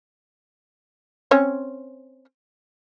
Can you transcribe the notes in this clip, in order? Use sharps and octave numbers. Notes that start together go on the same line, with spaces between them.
C4 C#4 C#5